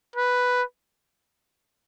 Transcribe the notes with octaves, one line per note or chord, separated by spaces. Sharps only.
B4